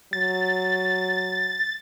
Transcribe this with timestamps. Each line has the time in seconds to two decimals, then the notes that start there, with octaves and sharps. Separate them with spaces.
0.13 F#3 A6